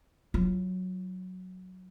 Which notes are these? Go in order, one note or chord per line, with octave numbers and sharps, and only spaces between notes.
F#3 F4